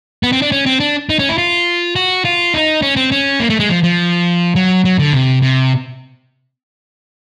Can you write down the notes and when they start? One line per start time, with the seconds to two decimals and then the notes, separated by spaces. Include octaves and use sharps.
0.23 B3
0.32 C4
0.42 D4
0.52 C#4
0.66 C4
0.80 D4
1.09 D#4
1.19 C#4
1.29 E4
1.38 F4
1.96 F#4
2.25 F4
2.54 D#4
2.82 C#4
2.96 C4
3.12 C#4
3.40 A#3
3.50 A3
3.60 G#3
3.69 F3
3.83 F3
4.55 F#3
4.85 F#3
4.99 D3
5.13 C3
5.42 C3